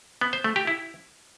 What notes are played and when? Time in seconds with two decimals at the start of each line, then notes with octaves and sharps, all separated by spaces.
0.21 B3
0.33 C5
0.44 A3
0.56 G4
0.67 E4